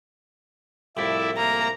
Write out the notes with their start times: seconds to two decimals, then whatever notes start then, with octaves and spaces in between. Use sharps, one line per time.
0.97 C2 F2 A2 E4 D5 E5
1.37 A#3 A#5